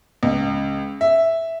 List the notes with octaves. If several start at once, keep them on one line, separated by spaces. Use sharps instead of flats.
C#2
E5